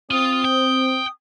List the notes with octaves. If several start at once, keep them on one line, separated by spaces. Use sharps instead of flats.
C4 F4 D#6
G5